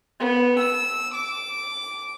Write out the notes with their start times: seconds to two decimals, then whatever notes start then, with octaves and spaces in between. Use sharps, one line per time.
0.20 B3
0.59 E6
1.14 D6